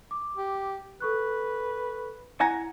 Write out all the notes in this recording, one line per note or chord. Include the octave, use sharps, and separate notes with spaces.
D6
G4
A4 B4 C#6 F#6
E4 F#5 G#5 A#5